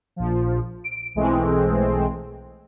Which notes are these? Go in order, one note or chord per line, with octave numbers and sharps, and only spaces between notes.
A#1 F3
D7
B1 E3 G#3 A3 C4